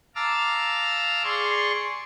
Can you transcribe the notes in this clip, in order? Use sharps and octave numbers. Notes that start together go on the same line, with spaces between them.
F5 A5 A#5 D6 E6 F6
G#4 D5 C6 C#6